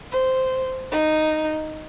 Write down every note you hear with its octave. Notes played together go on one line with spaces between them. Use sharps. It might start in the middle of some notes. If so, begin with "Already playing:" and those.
C5
D#4